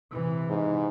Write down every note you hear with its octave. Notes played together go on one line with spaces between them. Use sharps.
C3 E3
G#2